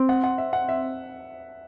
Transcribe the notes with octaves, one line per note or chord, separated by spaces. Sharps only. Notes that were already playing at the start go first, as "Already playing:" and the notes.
Already playing: C4
F#5
F#5
E5
F#5
E5